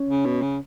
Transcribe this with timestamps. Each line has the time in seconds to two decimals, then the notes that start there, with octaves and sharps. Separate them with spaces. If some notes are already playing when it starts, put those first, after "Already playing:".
Already playing: C#4
0.09 C#3
0.25 B2
0.42 C#3